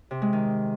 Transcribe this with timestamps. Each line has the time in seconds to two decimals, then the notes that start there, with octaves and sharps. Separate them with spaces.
0.11 C3
0.22 G#3
0.33 D#3